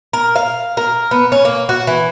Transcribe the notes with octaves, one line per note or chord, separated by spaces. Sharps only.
A#4
F5
A#4
B3
C#4
A#3
F#4
E3